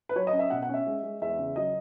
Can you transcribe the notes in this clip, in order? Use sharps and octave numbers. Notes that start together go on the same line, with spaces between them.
B4
F#3 C#5
D#5
C#4
E5
B2 F#5
F#5
C#4 E5
G#3
G#3
E2 E5
C#3
F#3 D#5